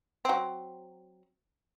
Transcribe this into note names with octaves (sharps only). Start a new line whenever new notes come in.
F#3 C4